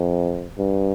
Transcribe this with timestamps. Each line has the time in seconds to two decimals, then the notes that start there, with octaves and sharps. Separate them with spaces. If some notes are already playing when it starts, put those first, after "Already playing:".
Already playing: F2
0.58 G2